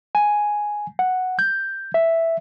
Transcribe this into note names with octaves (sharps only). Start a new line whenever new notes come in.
G#5
F#5
G6
E5